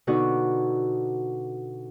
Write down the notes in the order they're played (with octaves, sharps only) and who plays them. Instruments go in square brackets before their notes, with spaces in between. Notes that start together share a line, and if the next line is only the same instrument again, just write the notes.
[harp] B2 D3 D#4 F#4